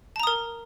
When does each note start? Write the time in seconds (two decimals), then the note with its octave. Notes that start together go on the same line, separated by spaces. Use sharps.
0.16 A5
0.20 A#5
0.23 D#6
0.27 A#4